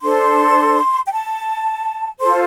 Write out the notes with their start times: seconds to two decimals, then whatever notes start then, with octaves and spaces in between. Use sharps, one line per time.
0.01 D4 A4 C5 C6
1.06 G5
1.11 A5
2.20 F4 A4 C5 C6